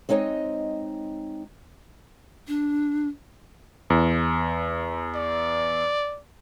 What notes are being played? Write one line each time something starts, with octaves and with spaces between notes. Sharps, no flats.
G#3 C4 D#4 C#5 D#5
D4
E2
D5